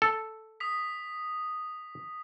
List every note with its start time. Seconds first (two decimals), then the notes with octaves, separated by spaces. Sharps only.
0.02 A4
0.60 D#6 B6